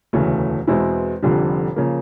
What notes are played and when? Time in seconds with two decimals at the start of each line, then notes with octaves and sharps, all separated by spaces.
0.13 E1 D2 C#3 E3 A3
0.67 E2 B2 G#3 C4 E4
1.22 F1 F2 D3 G3
1.76 C#3 F3 A#3